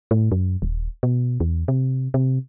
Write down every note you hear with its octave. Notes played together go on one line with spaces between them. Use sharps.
A2
F#2
D#1
B2
E2
C3
C3